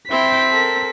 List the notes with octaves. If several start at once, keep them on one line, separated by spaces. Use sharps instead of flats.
C4 E4 G5 B6
A4 A#4